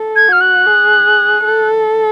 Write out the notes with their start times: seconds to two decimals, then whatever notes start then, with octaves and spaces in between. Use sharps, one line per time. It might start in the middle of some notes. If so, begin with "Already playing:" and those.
Already playing: A4
0.16 G#6
0.28 F#4 F6
0.41 F#6
0.67 G#4
1.45 A4